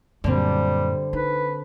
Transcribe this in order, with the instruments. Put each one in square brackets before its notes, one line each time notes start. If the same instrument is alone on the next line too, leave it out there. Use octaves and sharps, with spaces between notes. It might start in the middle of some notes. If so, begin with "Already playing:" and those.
[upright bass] F#2 A#2 [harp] D3 C4 [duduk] G3
[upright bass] D#4 [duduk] B4